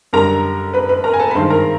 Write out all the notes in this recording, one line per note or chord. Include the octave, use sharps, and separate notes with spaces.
F#2 D3 G3 A#4 A#5
B4 B5
B4 B5
A#4 A#5
G#5
A4 A5
B5
G2 D#3 G#3 C5 C6
A#4 A#5